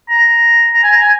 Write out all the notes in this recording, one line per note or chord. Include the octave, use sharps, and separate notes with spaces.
A#5
A#5
G#5
A#5
G#5